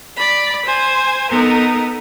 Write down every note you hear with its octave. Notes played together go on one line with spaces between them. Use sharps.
D5 B5
C5 G#5
B3 D#4 A4 A#4